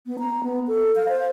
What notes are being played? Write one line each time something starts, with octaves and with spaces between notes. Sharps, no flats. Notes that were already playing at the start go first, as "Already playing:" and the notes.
B3
A#5
B3
A4
F5
C5